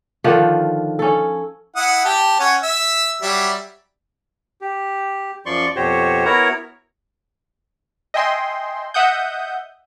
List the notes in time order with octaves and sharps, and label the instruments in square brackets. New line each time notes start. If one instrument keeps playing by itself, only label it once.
[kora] D3 D#3 F3
C#4 A4
[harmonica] E4 F#5 D#6
G4 A5
C#4 C#5 F#5
E5 E6
F#3 G3 E5
[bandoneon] G4
F#2 F3 D5 C6 C#6
F2 B2 F#4 G4 C5 C#5
B3 E4 F#4 A#4 C#5 A#5
[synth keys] D#5 E5 G5 G#5 C6
D#5 E5 F#5 D#6 G6